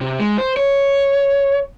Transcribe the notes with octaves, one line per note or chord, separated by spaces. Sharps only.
C3
G#3
C5
C#5